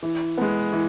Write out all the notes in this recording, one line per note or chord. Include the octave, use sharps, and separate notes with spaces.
E3
G#3 B3
E3